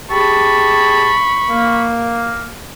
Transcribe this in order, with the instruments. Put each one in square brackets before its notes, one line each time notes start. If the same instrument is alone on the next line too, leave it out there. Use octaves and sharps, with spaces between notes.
[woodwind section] G4 G#4 A5 [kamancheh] B5 C#6
[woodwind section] A#3